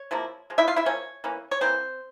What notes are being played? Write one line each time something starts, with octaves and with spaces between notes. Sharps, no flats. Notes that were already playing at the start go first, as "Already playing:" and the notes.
Already playing: C#5
C3 F3 A#3 E4
F3 G#3
E4 E5
F4 F5
E4 E5
F3 A#3 C#4 C#5
E3 A#3 C#4
C#5
E3 G3 A#3 C4 C5